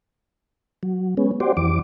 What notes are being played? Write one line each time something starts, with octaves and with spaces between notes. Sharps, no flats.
F#3
G#3 B3 C#4
F#4 G4 C5 D5
F2 E3 D6